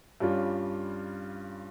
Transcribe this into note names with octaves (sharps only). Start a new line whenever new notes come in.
G2 G3 C#4 F4